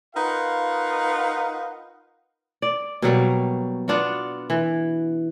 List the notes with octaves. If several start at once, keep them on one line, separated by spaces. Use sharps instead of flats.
D#4 F4 A#4 B4 F5 F#5
D5
B2 F#3 G3 A#3
B3 D4 F4 F#4
E3